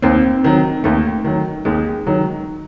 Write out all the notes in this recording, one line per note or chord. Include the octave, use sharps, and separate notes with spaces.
D#2 C4
D#3 F#3
D#2 A3
D#3 F#3
D#2 G#3
D#3 F#3